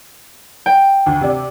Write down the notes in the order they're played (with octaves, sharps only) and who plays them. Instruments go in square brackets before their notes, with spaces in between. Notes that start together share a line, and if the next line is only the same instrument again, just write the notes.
[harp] G5
[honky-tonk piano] D2
C3 D5